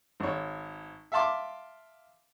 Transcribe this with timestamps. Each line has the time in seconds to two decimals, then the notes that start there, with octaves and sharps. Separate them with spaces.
0.20 G#1 C#5
1.12 E5 F5 A5 C6 D6